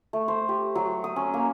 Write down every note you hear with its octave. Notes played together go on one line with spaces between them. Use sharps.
A3
C5
G4
F#3
D#6
C#4
A#3